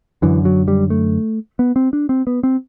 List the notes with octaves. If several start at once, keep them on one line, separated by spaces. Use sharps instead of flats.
F#2 D3 E3
F#3
G3
A3
B3
C4
D4
C4
B3
C4